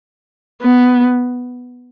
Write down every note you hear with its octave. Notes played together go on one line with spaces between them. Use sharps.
B3